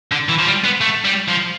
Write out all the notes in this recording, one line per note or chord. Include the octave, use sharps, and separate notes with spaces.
D3
E3
F3
G3
B3
A3
G3
F3